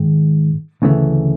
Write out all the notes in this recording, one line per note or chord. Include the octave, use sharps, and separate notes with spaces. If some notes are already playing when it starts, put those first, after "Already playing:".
Already playing: G#2 D#3 G#3
D2 C#3 E3 A3